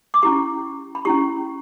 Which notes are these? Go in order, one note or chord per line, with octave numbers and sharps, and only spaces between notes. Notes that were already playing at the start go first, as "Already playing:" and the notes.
D6
C#4 E4 G4 C#6
B5
C#4 E4 G4 C#6